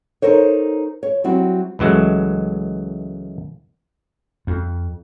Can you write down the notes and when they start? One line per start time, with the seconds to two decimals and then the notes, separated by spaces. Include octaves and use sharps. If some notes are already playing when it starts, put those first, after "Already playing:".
0.22 D#4 A4 A#4 C5 C#5
1.03 C#5
1.24 F#3 G3 C4 E4 F#4
1.79 C#2 E3 F#3 G#3 A3
4.47 F2